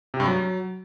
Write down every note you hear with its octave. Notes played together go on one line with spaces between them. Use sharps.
C3
G2
F#3